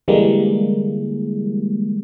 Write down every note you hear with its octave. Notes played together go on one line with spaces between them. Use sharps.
D3 E3 G3 G#3 A#3